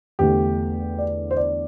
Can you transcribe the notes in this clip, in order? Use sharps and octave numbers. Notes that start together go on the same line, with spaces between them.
E2 D3 A3 G4
D5
C5
D5